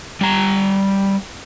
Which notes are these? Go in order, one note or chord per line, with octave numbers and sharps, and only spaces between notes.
G3 A#5